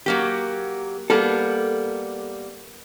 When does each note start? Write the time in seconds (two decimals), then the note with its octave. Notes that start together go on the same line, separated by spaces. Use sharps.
0.06 F#3 A#3 G4
1.10 G3 A#3 B3 A4